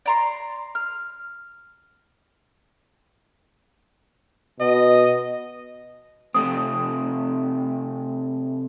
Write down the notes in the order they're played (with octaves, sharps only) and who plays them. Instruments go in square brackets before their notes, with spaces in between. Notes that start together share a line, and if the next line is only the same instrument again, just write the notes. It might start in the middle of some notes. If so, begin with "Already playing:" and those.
[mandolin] D5 A#5 C6
F6
[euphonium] B2 [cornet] D#5
[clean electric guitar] C3 A3 C4 [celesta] D#6